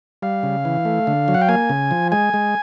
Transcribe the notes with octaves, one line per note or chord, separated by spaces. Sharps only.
G3 F5
C#3
E3
A3
D3
F#3
F#5
G5
A#3 G#5
C#3
F3
G#3 G#5
G#3